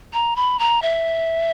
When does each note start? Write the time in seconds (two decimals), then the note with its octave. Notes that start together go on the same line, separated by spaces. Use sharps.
0.13 A#5
0.36 B5
0.59 A#5
0.82 E5